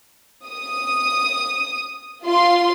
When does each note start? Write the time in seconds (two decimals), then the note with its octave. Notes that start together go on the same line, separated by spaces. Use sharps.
0.48 D#6
2.25 F4 C6